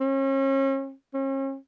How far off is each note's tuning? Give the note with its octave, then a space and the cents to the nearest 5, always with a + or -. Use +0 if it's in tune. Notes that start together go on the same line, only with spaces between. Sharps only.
C#4 -40
C#4 -40